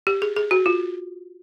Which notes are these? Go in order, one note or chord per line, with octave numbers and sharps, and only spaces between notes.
G4
G#4
G#4
F#4
F4